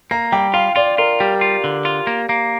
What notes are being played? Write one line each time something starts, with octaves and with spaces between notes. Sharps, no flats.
A#3 A#5
G3 G5
F4 F5
F4 D5
F4 A#4
G3 G4
F4
D3
F4
A#3
A#3